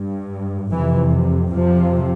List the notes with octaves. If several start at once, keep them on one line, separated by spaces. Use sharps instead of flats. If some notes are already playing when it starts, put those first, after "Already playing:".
Already playing: G2
F2 C3 E3
F2 C3 F3